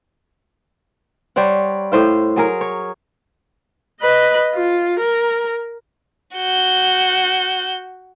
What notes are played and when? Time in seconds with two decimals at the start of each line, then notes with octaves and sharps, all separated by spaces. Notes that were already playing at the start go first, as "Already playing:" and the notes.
1.36 G3 C5 C#5 F#5
1.92 A2 C5 F5
2.36 F#3 G#4 A#4
2.61 C#5
4.01 B4 D#5
4.54 F4
4.99 A#4
6.36 F#4 G6